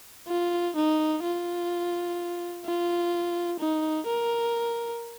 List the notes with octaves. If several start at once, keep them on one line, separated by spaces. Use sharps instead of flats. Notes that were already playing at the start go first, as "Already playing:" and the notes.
F4
D#4
F4
F4
D#4
A#4